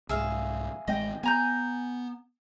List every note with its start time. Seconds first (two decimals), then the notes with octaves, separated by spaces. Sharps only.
0.09 C2 G#2 G#4 E5 F5
0.88 A1 G#3 C4 D#5 G5
1.23 B3 G#5 A#5 G6